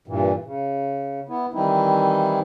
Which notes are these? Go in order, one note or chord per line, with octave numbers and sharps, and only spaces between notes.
G2 A#2 E3
C#3
B3 E4
D#3 E3 G3 C4 D#4 E4